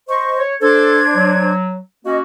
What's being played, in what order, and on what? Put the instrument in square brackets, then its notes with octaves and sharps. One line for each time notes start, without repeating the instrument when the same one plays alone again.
[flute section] C5 D#5 C#6
[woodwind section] C#5
[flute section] D4 C5 G#6 [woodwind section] A4
[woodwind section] F#3
[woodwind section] A#3 C#4 F#4 [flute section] D#5